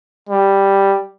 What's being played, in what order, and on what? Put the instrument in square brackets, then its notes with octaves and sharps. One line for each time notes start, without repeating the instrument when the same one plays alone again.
[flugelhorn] G3